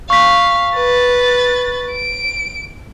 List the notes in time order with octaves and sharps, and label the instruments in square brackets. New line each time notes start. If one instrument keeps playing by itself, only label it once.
[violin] F5 [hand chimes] C#6 B6
[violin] B4 A6
D7